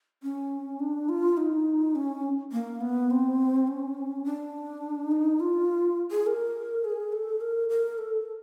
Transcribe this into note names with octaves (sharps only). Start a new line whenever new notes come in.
C#4
D4
F4
D#4
C#4
A#3
B3
C4
C#4
D4
D#4
F4
G#4
A#4
G#4
A4
A#4
A#4
A4